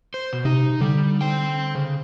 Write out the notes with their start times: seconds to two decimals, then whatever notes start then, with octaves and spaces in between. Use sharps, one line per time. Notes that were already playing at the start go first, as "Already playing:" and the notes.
0.14 C5
0.33 B2
0.45 C3 D#4
0.81 D3 G3
1.21 C5 G5
1.75 C#3